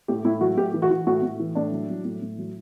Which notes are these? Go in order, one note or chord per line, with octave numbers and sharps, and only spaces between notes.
A2 G4
A2 E4
F#3 F#4
A2 G4
E3
F#4
E3
A2 F#4
A2
E3
A2 D4
F#3
F#3
A2
A2
F#3